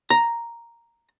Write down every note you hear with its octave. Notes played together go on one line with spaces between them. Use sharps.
A#5